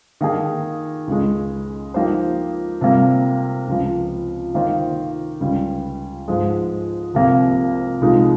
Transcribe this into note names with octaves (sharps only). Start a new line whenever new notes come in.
D#3 A#3 D#4 G#4
C#2 C#3 G#3
F3 A#3 D#4 G4 C5
C3 G3 A#3 F4
C#2 C#3 F3
D#3 A#3 F4 C5
C#2 C#3 G3
G#2 F3 G#3
C2 C3 F3 A#3
C2 A#2 F3 G#3 D#4